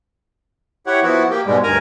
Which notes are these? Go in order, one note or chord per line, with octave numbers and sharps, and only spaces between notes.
E4 G4 C#5 F#5
F3 B3 E4 F#4
A#3 G4
G#2 B2 G3 G#3
D2 G2 A#4 G#5 A#5